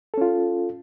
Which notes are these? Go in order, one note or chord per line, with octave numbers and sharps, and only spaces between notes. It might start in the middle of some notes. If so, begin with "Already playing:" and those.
C#4 F4 A4